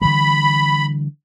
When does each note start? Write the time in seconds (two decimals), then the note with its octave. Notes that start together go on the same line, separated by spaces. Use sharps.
0.01 D3 E3 G3 B5